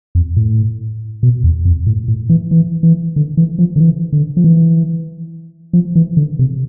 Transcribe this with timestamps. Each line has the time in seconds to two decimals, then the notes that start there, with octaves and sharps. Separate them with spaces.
0.15 F2
0.37 A2
1.23 B2
1.44 E2
1.65 F2
1.87 A2
2.08 A2
2.29 E3
2.51 E3
2.83 E3
3.16 D3
3.37 E3
3.58 F3
3.76 D3
3.80 E3
4.12 D3
4.37 F3
4.44 E3
5.73 F3
5.95 E3
6.17 D3
6.39 C3